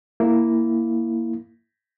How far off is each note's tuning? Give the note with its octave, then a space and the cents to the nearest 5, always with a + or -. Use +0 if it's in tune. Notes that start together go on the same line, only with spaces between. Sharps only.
A#3 +0 E4 +0